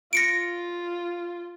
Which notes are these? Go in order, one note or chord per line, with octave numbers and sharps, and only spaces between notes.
F4 A#6 C#7 D7